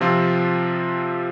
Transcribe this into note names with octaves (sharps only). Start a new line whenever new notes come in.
C3 F3 C4 F4